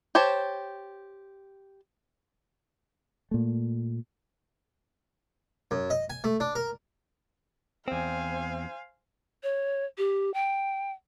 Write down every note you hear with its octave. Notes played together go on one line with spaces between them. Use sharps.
G4 C5 C#5 A5
A#2 A3
F#2
D#5
G#5
A3
D4
A#4
E2 C4 C5 F5 G#5
C#5
G4
G5